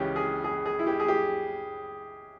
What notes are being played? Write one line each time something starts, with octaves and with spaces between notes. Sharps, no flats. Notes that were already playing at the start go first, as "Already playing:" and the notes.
Already playing: C#2 C#3 E3 C#4 G4
G#4
G#4
G#4
E4
G4
G#4
G4